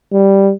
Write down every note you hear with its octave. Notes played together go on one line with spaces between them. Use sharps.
G3